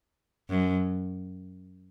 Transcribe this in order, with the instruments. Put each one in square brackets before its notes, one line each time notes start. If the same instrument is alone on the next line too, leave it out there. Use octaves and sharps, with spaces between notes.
[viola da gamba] F#2